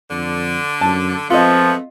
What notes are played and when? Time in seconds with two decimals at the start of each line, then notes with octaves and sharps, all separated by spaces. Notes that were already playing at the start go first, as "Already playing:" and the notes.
0.11 F2 D3
0.81 F#2 A5
1.30 F3 G#3 A3 B3 C4 F4 D#5